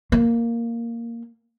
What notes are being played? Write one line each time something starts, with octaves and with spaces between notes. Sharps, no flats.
A#3